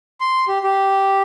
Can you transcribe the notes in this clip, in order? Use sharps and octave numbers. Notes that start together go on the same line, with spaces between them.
C6
G4
G4